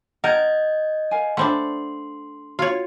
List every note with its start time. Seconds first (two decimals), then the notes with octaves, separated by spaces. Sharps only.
0.24 A#4 D#5 F#5 G6 G#6
1.11 A#4 F5 G#5
1.37 A3 C4 D4 F#5 B5 C6
2.59 F4 F#4 C#5